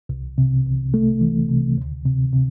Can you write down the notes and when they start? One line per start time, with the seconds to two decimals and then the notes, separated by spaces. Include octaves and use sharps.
0.09 C2
0.38 C3
0.66 C2
0.94 A3
1.21 E3
1.49 C3
1.77 D2
2.05 C3
2.33 C3